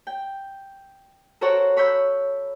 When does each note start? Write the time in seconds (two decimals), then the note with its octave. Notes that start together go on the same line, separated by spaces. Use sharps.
0.07 G5
1.41 F#4 A4 A#4 C5 C#5 F#5
1.77 C#5 B5 E6 G6